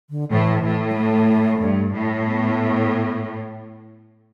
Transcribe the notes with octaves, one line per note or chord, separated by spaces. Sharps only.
D3
A2 E3
A2
G3
A3
G2
A2
B3